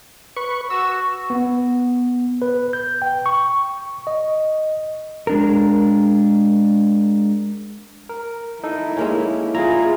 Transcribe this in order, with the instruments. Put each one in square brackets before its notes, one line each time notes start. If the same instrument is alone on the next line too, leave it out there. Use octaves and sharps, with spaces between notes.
[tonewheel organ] B4 C#6
[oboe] F#4 [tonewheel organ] E6
[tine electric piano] B3
B4
G6
G5
C#6
D#5
[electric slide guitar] G#3 D4 A#4
[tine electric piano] A#4
[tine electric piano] D#4 A4 [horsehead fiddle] E4
[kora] G#3 A#3 C#4
[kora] E4 [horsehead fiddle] F4 G#4 [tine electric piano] A#5